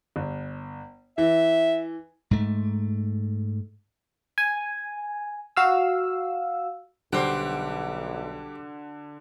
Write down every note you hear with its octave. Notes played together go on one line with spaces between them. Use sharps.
G1
E3 E5
G#2 A3
G#5
F#4 F5 E6
B1 D3 G3 F#4 C5 F#6 D7